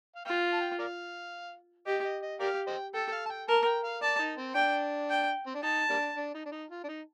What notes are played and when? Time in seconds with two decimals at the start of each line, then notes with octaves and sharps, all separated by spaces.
0.15 F5
0.25 F4 G5
0.53 A5
0.61 G5
0.79 A#4 D5 F5
1.86 G4 D#5
2.04 D#5
2.22 D#5
2.40 G4 A#4 D5 F5
2.67 C5 D#5 G5
2.94 A4 G5
3.12 F5
3.26 A5
3.30 G5
3.48 A#4 A5
3.66 G5
3.84 F5
4.02 D5 A5
4.19 D#4
4.37 C4
4.55 D4 G5
5.10 G5
5.47 C4
5.55 D4
5.63 D#4 A5
5.90 G3 A#3 D4
6.17 D4
6.34 D#4
6.45 D4
6.52 D#4
6.70 F4
6.84 D4
6.88 D#4